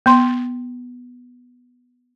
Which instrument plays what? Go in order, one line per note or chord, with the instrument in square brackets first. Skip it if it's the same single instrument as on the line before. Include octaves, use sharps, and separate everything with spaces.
[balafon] B3 C6